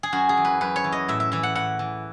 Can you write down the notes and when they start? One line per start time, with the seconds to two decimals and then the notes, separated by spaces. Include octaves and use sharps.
0.03 G#4
0.12 F#2 F#4
0.29 G#4
0.37 E3
0.45 B4
0.61 F#2 B4
0.76 C#5
0.84 E3
0.92 D#5
1.08 A2 E5
1.20 E5
1.32 E3 E5
1.43 F#5
1.55 A2 F#5
1.79 E3